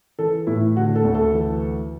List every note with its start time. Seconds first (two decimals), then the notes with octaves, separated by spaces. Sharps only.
0.19 E3 A4
0.47 A2 E4
0.76 D3 F#4
0.95 A4
1.04 D2
1.15 A4
1.34 E3